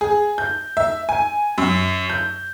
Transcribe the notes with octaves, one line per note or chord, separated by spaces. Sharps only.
G#4
G6
E5
G#5
F#2
G6